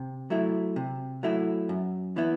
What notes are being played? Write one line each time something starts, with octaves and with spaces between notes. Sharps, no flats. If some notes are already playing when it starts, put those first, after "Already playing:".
Already playing: C3
F#3 A3 E4
C3
F#3 A3 E4
F#2
E3 B3 E4